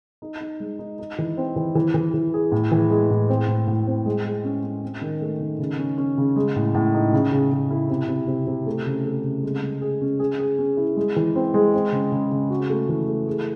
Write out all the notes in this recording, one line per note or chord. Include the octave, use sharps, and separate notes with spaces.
D#4
D#4
G#3
D#4
D#4
E3
C4
E3
E3
E3
E3
G#4
A2
E3
G#3
A2
C4
A2
A2
C4
G#3
G#3
C#4
C#4
C4
D#3
A3
D#3
C#3
C#4
C#4
C#3
G#3
A2
A2
D#4
C#3
C#3
C#3
E4
C3
C3
C3
C3
A3
C#3
A3
C#3
G#3
G#3
G#4
C#4
G#4
G#4
C#4
E4
G#3
E3
C4
G#3
C4
C#3
C#3
C#3
F#4
A3
E3
A3
G#4